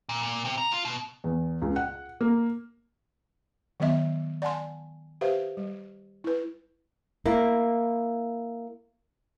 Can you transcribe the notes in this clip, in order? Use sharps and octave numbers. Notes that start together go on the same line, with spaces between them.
A#2
A#2
C3
A#5
F4
B2
E2
C#2
F#5
A#3
D#3 F#3 B3 D#5 E5
D5 F#5 G#5 A5 C6
G4 B4 C5 E5 F5
G3
E4 B4
A#3 E4